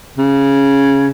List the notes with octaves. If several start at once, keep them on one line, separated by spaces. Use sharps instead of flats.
C#3